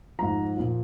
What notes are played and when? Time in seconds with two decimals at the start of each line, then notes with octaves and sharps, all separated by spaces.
0.19 G#2 F3 A#5
0.57 A#2 F3